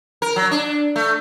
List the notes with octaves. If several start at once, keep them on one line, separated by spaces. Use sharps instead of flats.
A#4
F#3
D4
A3